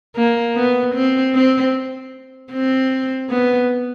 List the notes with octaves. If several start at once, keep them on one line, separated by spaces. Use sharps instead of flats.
A#3
B3
C4
C4
C4
B3